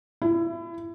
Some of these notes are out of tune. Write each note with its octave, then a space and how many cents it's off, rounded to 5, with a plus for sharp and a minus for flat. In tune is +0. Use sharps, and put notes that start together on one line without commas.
E4 +25